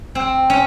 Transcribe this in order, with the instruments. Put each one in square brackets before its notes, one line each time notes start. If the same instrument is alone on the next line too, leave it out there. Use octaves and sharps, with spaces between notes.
[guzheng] C4
C#4